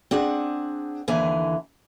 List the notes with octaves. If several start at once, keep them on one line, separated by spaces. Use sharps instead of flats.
C4 D4 G#4 F#5
D#2 D3 E3 G#5